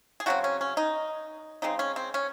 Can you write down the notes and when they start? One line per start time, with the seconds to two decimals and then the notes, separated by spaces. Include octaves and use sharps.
0.20 G#4
0.26 C#3 F#3 C4 F#4
0.44 C#4
0.61 C#4
0.77 D#4
1.62 C#3 G#3 C4 D#4
1.79 C#4
1.96 C4
2.14 C#4